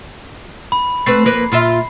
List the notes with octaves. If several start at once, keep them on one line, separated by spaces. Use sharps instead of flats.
B5
A3 C4 B4 C7
F2 A#3 B4
A#2 F4 E5